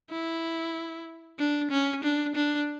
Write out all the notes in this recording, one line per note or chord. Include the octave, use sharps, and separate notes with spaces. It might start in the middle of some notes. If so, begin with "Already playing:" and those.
E4
D4
C#4
D4
D4